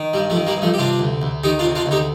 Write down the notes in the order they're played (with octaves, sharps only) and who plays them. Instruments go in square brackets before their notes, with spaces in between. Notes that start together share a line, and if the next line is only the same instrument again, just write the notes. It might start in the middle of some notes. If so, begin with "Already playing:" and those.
Already playing: [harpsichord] D#3
G2 G3
F3 A3
D#3
G3 A#3
G2
F3 A3
G4
C3 D4 F4
D2
D2
D#3 D#4 G4
D4 F4
C3
D4 F4
D2
D#4 G4